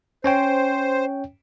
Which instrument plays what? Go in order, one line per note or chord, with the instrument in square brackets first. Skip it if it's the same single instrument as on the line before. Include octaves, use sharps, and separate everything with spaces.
[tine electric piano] C#4 C#5 G5 [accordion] C5